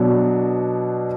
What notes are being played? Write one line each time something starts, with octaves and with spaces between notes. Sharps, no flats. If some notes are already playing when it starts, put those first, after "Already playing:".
Already playing: B2 F#3 B3 D4 F#4